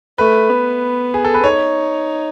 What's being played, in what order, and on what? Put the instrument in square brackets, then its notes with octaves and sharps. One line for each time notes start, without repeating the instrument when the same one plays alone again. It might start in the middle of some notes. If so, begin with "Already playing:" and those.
[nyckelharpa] A3 [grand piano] B4
[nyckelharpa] B3
[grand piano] G#4
A4
B4
[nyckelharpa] D#4 [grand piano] C#5